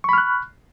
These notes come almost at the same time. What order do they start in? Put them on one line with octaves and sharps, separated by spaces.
C#6 B5 F6 F#6